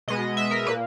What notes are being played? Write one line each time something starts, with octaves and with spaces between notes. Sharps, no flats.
B2 G#3 B3 D#5
E5
A#4
A#2 A#3 B4